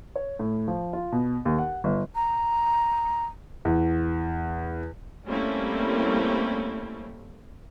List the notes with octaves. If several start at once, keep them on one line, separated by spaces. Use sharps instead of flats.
C#5
A2
F3
F4
B2
D#2
F#5
G1
A#5
E2
G3 A3 A#3 C4 C#4 E4